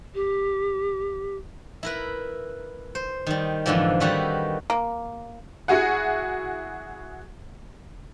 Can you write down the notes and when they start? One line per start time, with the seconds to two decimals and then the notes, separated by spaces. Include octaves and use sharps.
0.15 G4
1.83 E4 A#4 B4
2.95 C5
3.27 D#3 G3
3.66 F2 G#2 D3 E3 F3
4.00 D#3 G3 F#4 A4 B4
4.70 A#3
5.68 E4 F#4 G#4 F#5